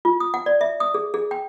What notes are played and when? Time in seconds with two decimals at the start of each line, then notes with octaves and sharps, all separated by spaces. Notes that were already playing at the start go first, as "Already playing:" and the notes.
0.05 F4
0.20 D#6
0.34 F#5
0.46 D5
0.61 E5
0.80 D#6
0.94 G#4
1.14 G#4
1.31 G5